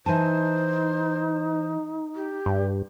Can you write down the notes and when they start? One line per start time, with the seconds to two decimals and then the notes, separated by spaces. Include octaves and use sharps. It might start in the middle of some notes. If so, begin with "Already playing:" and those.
0.06 E3 D#4 C5 G#5 A5
2.15 G4
2.46 G2